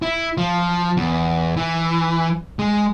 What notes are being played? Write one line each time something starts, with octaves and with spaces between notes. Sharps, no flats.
E4
F3
E2
E3
G#3